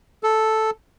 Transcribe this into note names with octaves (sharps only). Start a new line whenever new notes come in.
A4